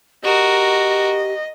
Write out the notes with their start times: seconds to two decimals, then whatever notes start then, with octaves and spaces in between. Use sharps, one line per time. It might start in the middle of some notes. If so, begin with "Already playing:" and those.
0.24 F#4 G4 A#4 D#5